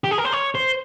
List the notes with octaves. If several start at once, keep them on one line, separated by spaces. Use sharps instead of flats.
G4
G#4
A#4
C5
C#5
C5